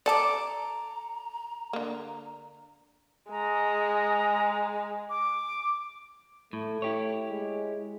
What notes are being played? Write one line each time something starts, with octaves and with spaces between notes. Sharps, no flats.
A4 D5 A5 A#5 D6
D3 A#3
G#3 A#5
D6
A2 A3
E4 G4 C#5
G#3